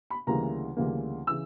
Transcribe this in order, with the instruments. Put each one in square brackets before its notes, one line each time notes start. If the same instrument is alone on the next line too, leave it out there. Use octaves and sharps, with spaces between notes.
[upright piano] B5
D2 C#3 E3 G3 A#3 A#5
D2 C#3 E3 G3 A#3
C#3 E3 E6